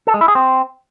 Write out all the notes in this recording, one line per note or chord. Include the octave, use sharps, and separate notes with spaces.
A4
G#3
E4
G#4
C4